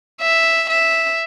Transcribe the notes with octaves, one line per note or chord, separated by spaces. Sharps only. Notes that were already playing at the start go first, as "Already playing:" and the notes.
E5
E5